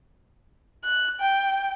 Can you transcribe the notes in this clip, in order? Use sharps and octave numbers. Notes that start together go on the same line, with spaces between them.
F#6
G5